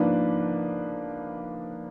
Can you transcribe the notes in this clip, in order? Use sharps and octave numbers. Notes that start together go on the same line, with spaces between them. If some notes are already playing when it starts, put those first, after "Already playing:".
Already playing: G#2 F3 A#3 D4 B4